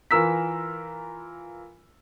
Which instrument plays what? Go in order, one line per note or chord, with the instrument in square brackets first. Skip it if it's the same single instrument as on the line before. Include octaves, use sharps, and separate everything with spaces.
[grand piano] E3 F4 A#4 E6 B6